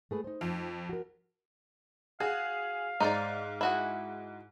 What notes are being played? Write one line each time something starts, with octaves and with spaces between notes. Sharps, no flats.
A3 G#4 B4
D#4 C5
F2
F#4 A#4
F#4 G#4 F5
G#2 D#4 C5 D5
E4 F#4 G#4